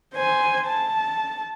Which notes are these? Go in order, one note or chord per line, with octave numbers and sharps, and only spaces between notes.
C5 G#5
A5